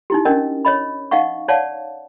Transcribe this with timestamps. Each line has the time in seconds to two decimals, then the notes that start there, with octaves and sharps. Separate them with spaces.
0.10 D#4 E4 G4
0.25 C#4 D4 A#4 D#5
0.65 C#5 D#5 B5
1.11 D#4 D#5 F5 F#5 C#6
1.48 C#5 D5 F5 F#5 A5